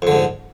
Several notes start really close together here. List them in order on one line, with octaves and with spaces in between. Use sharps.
F2 D3 G#2